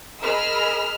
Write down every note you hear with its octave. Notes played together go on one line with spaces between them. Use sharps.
G#4 A#4 D#5 B5 E6 F6